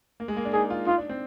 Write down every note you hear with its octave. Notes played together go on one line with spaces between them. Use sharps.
A#3
G#3
A#3
D4
D#4 G#4
F4
D#4 F4
D4
C4